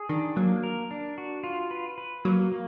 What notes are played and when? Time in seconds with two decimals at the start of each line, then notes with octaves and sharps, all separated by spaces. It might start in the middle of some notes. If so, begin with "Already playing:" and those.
Already playing: G#4
0.09 D#3 D4
0.36 F#3 A#3
0.63 A#4
0.91 D4
1.18 F#4
1.44 F4
1.71 B4
1.98 B4
2.25 F#3 A#3
2.52 A#3